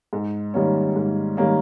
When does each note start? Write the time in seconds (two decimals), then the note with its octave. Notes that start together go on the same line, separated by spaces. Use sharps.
0.13 G#2
0.54 D#3 G3 A#3 C#4
0.96 G#2
1.37 D#3 G3 A#3 C#4